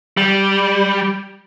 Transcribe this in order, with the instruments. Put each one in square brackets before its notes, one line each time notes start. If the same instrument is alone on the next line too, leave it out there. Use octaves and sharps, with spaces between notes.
[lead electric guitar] G3